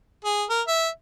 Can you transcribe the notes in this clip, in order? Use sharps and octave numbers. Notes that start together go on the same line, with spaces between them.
G#4
A#4
E5